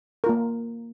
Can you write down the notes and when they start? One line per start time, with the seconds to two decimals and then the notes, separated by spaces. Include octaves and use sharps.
0.24 A#4
0.26 F4
0.29 A#3